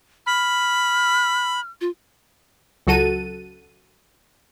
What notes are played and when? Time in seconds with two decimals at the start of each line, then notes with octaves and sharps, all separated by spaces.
0.26 B5 F6
1.81 F4
2.87 C#2 F#3 F#4 A4 D#7